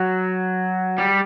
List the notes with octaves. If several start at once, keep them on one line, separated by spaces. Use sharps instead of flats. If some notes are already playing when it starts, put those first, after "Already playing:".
Already playing: F#3
G3